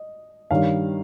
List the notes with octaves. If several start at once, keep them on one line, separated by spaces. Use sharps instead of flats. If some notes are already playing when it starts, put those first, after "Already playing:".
Already playing: D#5
G2 D#3 G3 C#5 F5